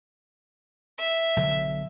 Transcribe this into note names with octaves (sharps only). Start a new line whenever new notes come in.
E5
B1 D3 F#3